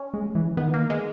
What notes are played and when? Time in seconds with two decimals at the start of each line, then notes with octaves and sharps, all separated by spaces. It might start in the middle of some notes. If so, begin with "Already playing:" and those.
Already playing: C#4
0.14 G#3
0.35 E3
0.57 D#3 B3
0.74 A#3
0.90 G#3